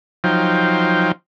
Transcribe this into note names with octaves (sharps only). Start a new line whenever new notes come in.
F3 F#3 D#4 C5 F5 G5